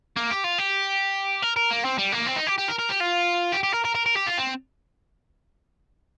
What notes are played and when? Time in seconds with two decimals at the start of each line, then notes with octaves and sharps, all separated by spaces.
0.16 A#3
0.31 G4
0.44 F4
0.58 G4
1.43 A#4
1.56 A#4
1.71 A#3
1.85 C4
1.98 G3
2.13 A#3
2.27 C4
2.37 D#4
2.47 G4
2.58 G4
2.69 A#4
2.79 A#4
2.90 G4
3.01 F4
3.52 G4
3.63 G4
3.73 A#4
3.85 A#4
3.95 A#4
4.06 A#4
4.16 G4
4.27 F4
4.38 C4